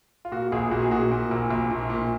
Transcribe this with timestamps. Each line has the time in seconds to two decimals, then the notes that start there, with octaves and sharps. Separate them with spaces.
0.25 F4
0.32 A#2 F#4
0.52 A#1 G#4
0.71 A#2 F#4
0.82 G#4
0.91 A#2 F#4
1.11 A#2
1.31 A#1
1.51 A#1
1.71 A#2
1.90 A#2